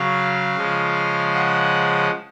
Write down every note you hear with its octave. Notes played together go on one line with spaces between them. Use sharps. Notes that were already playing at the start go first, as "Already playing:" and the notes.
Already playing: C#3 F#3 F5
C#3 F3 G#3
F#5